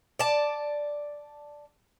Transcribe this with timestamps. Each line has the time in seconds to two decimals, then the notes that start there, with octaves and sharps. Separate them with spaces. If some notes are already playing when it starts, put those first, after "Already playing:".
0.19 D5 A5